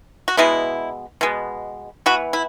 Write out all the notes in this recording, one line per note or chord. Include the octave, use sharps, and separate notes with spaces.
F#4
B2 G#3 B3 E4
B2 G#3 B3
E3 B3 F#4
E4